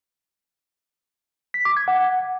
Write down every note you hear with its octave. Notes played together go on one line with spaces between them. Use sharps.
B6
D6
G#6
F#5